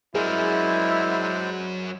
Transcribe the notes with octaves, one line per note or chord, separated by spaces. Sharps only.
F#3 G#3 E4 G#4 A#4 C5 D5